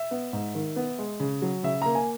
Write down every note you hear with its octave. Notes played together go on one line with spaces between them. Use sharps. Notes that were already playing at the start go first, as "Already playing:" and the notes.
Already playing: E5
B3
G#2
D#3
B3
G#3
C#3
F#3
C#3 E5
A#3 A#5
G#5